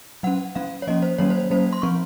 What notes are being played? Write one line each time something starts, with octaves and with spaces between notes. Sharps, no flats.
F#3 C#4 F#5
F#3 C#4 F5
C#5
F3 A#3 C#4 D#5
C5
D#3 F#3 A#3 C#4 C#5
C5
F#3 A#3 C#4 C5
C6
F3 C4 C#6